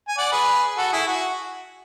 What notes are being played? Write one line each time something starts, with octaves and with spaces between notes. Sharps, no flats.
G#5
D5 F#5
G#4 B4
F#4 A4
E4 G#4
F#4